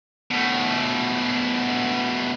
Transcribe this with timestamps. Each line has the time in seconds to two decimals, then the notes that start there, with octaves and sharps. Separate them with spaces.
0.31 B2 A3